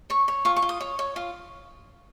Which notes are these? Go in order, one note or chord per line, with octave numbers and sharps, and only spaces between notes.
C#5 C#6
C#5
F4 C#6
C#6
F4
D#6
C#5
C#5
F4